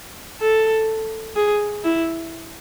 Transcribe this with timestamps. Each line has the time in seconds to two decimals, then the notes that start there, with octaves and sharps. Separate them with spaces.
0.41 A4
1.36 G#4
1.84 E4